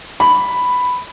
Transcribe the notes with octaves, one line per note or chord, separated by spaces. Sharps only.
B5